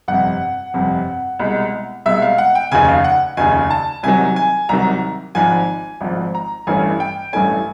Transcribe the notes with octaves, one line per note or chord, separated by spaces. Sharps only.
G1 F2 C3 F#5
G1 F2 C3
C2 B2 G#3
C2 B2 G#3 E5
F5
F#5
G5
F1 D#2 C#3 G#5
F5
F#5
F1 D#2 C#3 G#5
A5
C2 C3 D#3 F#3 G#5
G#5
C2 C3 D#3 F#3 A#5
G#1 G#2 F3 G#5
G#1 G#2 F3
A#5
A1 G2 E3 A3 C#4 G#5
G5
A1 G2 E3 A3 C#4 G#5